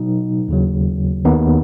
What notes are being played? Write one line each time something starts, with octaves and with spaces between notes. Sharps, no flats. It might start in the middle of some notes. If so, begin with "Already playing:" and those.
Already playing: B2 F#3 D#4
D#2 C#3 F#3
D#2 D#3 B3 D#4